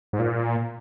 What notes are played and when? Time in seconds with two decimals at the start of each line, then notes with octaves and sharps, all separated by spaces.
0.13 G#2
0.19 A#2